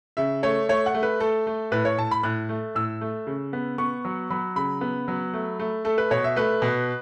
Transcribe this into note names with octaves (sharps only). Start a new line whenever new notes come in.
C#3 E5
A3 C#5
A3 C#5
F#5
A3
B4
A3 A4
A3
A2 B4
C#5
A2 A5
B5
A2 F#6
A3
A2 E6
A3
C#3
B3
B3 C#6
F#3
F#3 B5
C#3 B5
B3
F#3
A3
A3
A3 A4
B4
B2 C#5
E5
A3 B4
B2